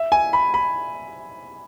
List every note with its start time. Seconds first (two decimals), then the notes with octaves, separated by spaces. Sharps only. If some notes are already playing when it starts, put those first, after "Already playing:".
Already playing: E5
0.12 G#5
0.33 B5
0.54 B5